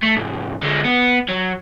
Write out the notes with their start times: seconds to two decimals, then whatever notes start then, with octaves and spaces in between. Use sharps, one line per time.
0.03 A3
0.16 C2 G#2
0.63 D3 G#3
0.85 B3
1.29 F#3